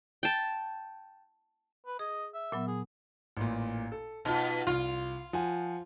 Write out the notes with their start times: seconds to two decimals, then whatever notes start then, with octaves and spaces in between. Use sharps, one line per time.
0.23 G5 A5
1.86 B4
1.99 G#4 D#5
2.34 E5
2.52 A#2 F#3 B3
2.67 G#4
3.37 A1 A#2
3.92 A4
4.25 B2 D#4 F4
4.67 C2 F4
5.33 F3 F#5 G#5